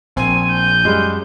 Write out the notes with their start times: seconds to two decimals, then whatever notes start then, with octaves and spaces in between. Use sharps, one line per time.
0.17 A#1 C4 G#5
0.51 G6
0.85 F#2 G3 G#3